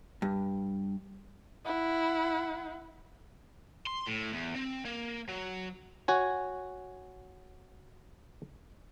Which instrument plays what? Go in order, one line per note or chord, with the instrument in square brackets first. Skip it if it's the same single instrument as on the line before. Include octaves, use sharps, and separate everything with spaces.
[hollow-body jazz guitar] G2
[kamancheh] E4 F#5
[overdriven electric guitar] C6
A2
E2
C4
A#3
F#3
[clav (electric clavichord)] F#4 C#5 G#5